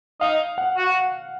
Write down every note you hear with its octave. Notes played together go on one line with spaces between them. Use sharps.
D#4 F5
F#5
F#4